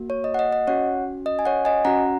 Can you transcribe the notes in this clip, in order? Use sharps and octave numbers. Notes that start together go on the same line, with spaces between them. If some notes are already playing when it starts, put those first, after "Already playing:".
Already playing: A#3 F#4
C#5
D#5
F#5
D#5
D#5
C#4 F#4 C#5 F#5
D#5
G#5
C#5 F#5
D#5 G#5
C#4 F#4 F#5 A#5